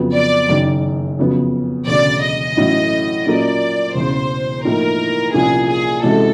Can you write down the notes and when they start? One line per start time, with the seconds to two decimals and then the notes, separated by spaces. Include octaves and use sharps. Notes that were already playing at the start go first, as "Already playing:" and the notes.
Already playing: F2 C#3 F#3 B3
0.14 D5
0.49 F#1 F#2 D#3
1.19 F2 C#3 F#3 B3
1.87 E1 D2 C#3 D5
2.23 D#5
2.57 A1 A2 F#3 A3 C#4
3.26 A#2 F#3 A#3 C#4 D5
3.95 E1 E2 C#3 C5
4.64 A2 F3 A#3 D#4 A#4
5.33 C2 A#2 F3 A#3 C#4 G#4
5.68 G#4
6.03 C3 E3 G#3 C#4 F#4 A4